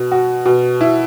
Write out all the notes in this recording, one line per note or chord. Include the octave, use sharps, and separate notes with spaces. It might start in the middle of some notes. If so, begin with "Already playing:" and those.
Already playing: B2
F#4
B2
E4